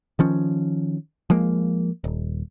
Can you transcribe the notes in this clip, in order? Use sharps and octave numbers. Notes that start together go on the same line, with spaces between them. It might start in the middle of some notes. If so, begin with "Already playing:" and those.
D#3 F3 C#4
F3 G#3 A#3
D#1